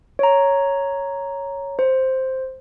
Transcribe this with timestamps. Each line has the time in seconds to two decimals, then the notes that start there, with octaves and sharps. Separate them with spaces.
0.19 C#5 A#5
1.79 C5